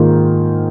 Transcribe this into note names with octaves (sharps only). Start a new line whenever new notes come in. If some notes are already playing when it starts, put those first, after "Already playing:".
Already playing: G#2 D#3 A#3 F4